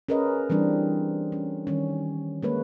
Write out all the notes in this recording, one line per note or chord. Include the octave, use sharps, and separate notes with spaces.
C#4 G#4 A#4 B4 D#5
E3 G3 C4 D4
C#4
D#3 G3 C#4
G#3 A#3 B4 C#5